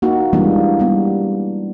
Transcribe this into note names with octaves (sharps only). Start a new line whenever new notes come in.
A#3 D#4 F#4
E3 G3 G#3 A#3 C4 D4
G3 B3